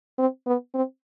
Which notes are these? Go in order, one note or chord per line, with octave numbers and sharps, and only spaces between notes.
C4
B3
C4